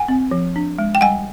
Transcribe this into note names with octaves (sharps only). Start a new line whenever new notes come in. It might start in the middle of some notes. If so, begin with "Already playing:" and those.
Already playing: F#5 G#5
C4
F3
D4
G#3
G5
G3 F#5 G#5